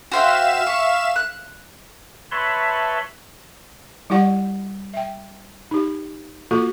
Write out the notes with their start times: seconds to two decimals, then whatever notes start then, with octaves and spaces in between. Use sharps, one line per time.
0.11 F#4 C5 E5 F5 G5 E7
0.67 C#6
1.16 F#6
2.31 B4 C#5 E5 A5 B5 C6
4.10 G3 E4 G4 D5 F#5
4.94 E5 G5
5.71 D#4 G4
6.51 A#3 F4 F#4 A4